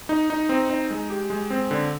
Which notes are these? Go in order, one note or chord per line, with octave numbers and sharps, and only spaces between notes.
D#4
D#4
C4
D#4
G#3
G4
G#3
C4
D3